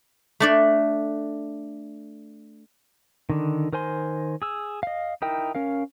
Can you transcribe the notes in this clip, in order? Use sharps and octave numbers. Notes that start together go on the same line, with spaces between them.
A3 D4 D5
D3 D#3
D#3 A#4 C5 G#5 C6
G#4 E6
D#5 F5
D#4 E4 A#4 G5
C#4 A#4 F5